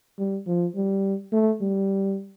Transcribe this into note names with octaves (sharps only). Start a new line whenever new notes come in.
G3
F3
G3
A3
G3